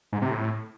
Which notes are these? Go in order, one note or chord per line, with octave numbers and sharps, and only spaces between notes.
G#2
C3
A2